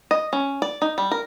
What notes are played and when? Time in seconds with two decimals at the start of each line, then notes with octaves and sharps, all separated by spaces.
0.11 D#5
0.33 C#4
0.62 D5
0.82 D#4
0.98 G3
1.11 A#4